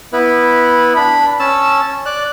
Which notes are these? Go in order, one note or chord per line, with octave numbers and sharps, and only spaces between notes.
B3 E4 B4
D4 B5
C#4 A5 E6
D5 F#6